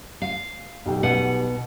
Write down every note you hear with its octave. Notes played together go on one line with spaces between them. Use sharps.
F5
B1 G3 G5
B2 F#5